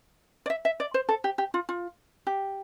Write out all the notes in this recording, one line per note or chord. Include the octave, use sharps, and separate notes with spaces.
D5
E5
E5
D5
C5
A4
G4
G4
F4
F4
G4